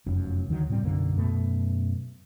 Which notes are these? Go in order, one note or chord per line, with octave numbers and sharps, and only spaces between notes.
F1 F#2
D2 D#3 F#3
A2 C3 G3 C4
B1 F#2 D3 A#3
F#2 B2 A3